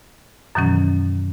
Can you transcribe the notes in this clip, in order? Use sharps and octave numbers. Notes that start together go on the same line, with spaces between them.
F#2 B2 D#3 E3 F#3 C#4